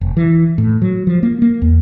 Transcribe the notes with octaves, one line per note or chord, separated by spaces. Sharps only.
F1
E3
A2
F#3
F3
A#3
A#3
E2